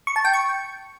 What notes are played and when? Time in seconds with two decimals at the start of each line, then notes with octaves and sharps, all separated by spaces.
0.07 C#6
0.16 A5
0.25 G5
0.33 C#6